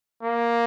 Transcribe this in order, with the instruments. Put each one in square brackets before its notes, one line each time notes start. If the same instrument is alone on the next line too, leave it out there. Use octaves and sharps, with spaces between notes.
[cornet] A#3